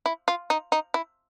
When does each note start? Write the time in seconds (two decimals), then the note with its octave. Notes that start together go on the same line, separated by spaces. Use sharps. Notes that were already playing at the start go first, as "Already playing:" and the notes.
0.06 E4
0.28 F4
0.50 D#4
0.72 D#4
0.94 E4